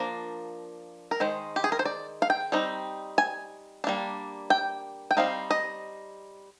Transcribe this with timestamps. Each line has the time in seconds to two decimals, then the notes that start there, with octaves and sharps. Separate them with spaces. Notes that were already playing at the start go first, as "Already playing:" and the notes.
Already playing: F3 A#3 D4 A#4
1.11 A#4
1.20 D#3 G#3 C5
1.56 G4
1.64 G#4
1.72 A#4
1.79 C5
1.85 D5
2.22 F5
2.30 G5
2.52 G3 C4 D#4
3.18 G#5
3.84 G3 A#3 D4
4.50 G5
5.11 G5
5.17 G3 C4 D#4 F5
5.51 D#5